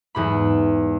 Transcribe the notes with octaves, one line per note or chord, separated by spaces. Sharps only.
E2 G#2 B5